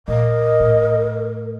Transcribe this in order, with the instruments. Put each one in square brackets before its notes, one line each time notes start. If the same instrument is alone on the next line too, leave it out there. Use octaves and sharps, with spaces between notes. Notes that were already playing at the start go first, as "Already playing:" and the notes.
[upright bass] A#2 [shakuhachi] A#4 [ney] D#5
[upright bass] A2